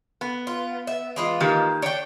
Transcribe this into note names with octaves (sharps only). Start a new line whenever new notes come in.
B3
F4
E5
E3 G#3 F4
D#3 A#3 G4
D4 C#5 G5